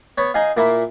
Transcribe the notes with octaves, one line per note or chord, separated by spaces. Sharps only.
B3 C#5
D#4 G#4 D#5 F5
A#2 A#3 E4